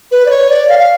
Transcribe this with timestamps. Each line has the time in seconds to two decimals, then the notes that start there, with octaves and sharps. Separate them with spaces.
0.12 B4
0.26 D5
0.30 C#5
0.50 D5
0.69 F5
0.79 F5